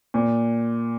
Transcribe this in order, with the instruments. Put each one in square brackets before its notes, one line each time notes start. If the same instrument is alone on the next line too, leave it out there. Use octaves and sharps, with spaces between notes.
[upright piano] A#2